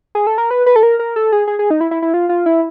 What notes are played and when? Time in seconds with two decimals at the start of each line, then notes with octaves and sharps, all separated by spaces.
0.15 G#4
0.27 A4
0.38 A#4
0.51 B4
0.66 B4
0.76 A4
0.83 A#4
0.99 A#4
1.16 A4
1.32 G#4
1.47 G#4
1.59 G#4
1.70 D#4
1.81 E4
1.91 E4
2.02 E4
2.14 F4
2.29 F4
2.46 E4